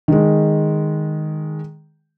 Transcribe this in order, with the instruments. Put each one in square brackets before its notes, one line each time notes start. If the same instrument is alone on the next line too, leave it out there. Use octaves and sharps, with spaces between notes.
[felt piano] D#3 G#3